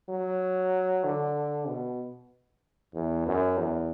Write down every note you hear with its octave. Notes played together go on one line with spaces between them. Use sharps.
F#3
D3
B2
E2
F#2
E2